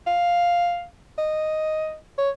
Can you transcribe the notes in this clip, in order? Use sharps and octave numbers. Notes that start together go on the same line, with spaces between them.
F5
D#5
C#5